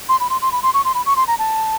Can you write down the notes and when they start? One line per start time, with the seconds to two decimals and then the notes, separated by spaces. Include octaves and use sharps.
0.09 C6
0.20 B5
0.30 C6
0.42 C6
0.52 B5
0.63 C6
0.74 C#6
0.85 C6
0.94 B5
1.06 C#6
1.16 C6
1.27 A#5
1.39 A5